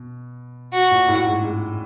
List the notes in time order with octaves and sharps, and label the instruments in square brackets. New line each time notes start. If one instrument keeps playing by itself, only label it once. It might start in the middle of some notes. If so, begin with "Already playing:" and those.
Already playing: [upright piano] B2
[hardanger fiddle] F#4
[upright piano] A#2
A2
G#2
G#2